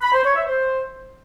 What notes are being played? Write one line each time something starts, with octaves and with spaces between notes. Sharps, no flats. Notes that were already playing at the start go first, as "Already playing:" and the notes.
B5
C5
C#5
E5
C5